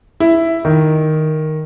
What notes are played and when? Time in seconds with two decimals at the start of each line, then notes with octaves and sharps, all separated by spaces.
0.20 E4
0.65 D#3